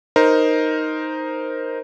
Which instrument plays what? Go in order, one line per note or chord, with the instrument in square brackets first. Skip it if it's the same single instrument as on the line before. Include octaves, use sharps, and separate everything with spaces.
[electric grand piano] D#4 A#4 C5